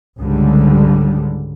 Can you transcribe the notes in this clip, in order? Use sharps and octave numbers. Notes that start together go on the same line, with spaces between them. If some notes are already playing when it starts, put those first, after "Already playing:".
C#2 G#2 D3 G3